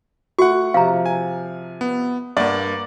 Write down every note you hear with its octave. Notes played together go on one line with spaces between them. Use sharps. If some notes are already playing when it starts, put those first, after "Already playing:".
A3 F#4 F#5 C#6
C3 F3 F5 A#5
G#5
B3
G2 A#3 D5 F#5 D6